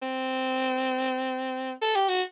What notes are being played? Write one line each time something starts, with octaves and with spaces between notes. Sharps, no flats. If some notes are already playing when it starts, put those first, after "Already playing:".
C4
A4
G4
F#4